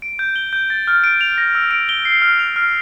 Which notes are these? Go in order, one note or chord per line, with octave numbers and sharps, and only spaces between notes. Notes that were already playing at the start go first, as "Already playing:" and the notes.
D7
G6
G7
G6
A6
F6
D7
F7
A#6
E6
D7
G7
C7
F6
F7
F6